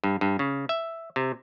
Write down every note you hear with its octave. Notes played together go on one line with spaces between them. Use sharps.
G2
G2
C#3
E5
C3